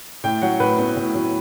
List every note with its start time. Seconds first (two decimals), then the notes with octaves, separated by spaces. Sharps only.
0.24 A2 G5
0.42 F#3 F#5
0.60 A2 B4
0.78 B3
0.97 A2
1.15 F#3